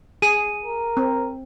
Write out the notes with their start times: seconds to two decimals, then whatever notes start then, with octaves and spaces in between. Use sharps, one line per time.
0.22 G#4 D#7
0.64 A#4
0.97 C4